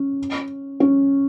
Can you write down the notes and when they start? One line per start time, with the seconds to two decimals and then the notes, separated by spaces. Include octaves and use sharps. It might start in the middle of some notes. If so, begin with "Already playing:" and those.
Already playing: C#4
0.80 C#4